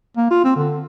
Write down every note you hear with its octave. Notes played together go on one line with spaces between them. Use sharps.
A#3
F4
C4
D3